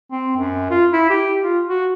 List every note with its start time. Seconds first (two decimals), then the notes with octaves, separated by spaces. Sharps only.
0.11 C4
0.37 F#2
0.71 F4
0.93 E4
1.10 G4
1.43 F4
1.69 F#4